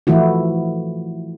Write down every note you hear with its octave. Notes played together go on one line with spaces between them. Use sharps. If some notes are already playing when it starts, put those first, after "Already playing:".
E3 F3 A3 E4 F#4